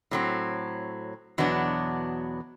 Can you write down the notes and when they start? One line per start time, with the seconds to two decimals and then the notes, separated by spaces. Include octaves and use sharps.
0.11 A2 F#3 C4
1.38 E2 B2 F#3 B3 D4